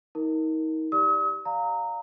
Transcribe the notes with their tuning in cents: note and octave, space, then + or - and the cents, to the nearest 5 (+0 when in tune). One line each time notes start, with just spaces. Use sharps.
D#4 +35 A#4 +0
G4 +0 D5 +0 D#6 +45
D5 +0 F5 +10 A#5 -15